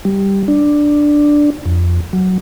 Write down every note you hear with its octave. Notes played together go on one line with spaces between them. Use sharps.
G3
D4
F2
F#3